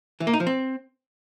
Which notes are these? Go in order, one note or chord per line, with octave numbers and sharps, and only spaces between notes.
E3
A#3
D#4
F3
C4